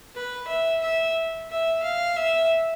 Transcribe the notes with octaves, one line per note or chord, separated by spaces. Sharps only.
B4
E5
E5
E5
F5
E5